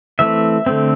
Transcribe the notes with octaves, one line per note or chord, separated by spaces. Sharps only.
E3 A3 C4 E5
D3 A3 C4